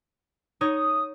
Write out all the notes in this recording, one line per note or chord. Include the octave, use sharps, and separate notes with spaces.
D#4 C#5 D#6